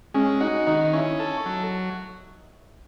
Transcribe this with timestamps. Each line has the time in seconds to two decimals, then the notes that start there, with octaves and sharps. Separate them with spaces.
0.14 G#3 C#4
0.40 D#4 F#4
0.67 D#3 D#4
0.93 C#4 E4
1.19 A4
1.46 F#3